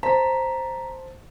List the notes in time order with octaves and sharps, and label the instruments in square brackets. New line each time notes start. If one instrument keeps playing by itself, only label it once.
[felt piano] C5 A5 [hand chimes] A#5 B6